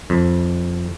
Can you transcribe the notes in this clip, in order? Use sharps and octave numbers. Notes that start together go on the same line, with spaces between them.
F2